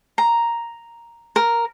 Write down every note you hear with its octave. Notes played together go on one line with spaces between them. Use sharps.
A#5
A#4